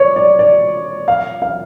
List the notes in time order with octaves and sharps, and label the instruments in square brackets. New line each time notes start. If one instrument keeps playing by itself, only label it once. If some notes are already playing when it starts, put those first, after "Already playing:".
Already playing: [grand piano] C#5 D5
D5
D5
F5
F5